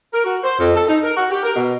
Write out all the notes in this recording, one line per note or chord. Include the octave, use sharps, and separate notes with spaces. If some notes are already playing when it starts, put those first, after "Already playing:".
A#4
F#4
C5
F2
A4
D#4
A#4
F#4
G4
A#4
B2